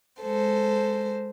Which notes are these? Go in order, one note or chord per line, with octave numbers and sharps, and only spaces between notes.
G#3 A4 C5